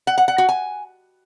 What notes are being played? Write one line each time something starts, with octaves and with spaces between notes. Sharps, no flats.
F#5
F#5
F#5
F#4
G#5